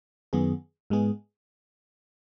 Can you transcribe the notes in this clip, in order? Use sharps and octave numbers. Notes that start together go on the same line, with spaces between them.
F#2 D#3 B3 G#4
G#2 G#3 B3 G#4